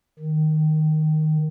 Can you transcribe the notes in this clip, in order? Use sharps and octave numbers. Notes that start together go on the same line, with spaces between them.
D#3